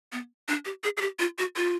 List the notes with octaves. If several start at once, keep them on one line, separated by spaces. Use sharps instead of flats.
B3
D4
G4
G#4
G#4
G4
F4
F#4
F4